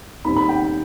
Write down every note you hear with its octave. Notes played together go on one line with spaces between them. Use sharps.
D#2 D#3 G3 C4 B5
B5
G5